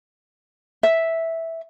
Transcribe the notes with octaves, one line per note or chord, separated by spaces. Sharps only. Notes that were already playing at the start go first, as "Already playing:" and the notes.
E5